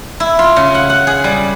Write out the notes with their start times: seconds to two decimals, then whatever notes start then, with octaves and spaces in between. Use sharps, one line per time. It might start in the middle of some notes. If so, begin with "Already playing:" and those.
0.20 E4
0.39 F4
0.56 C#3
0.74 F#5
0.90 F#5
1.07 G#4
1.24 G3